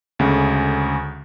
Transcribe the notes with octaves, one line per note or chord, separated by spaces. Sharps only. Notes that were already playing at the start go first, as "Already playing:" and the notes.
D2 C#3 G#3 A3